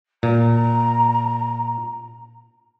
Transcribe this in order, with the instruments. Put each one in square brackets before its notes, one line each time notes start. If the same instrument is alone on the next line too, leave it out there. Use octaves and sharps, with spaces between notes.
[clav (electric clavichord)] A#2 [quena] A#5